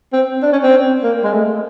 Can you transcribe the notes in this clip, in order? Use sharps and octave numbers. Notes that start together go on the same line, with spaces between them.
C4
D4
C#4
C4
A#3
G#3
A3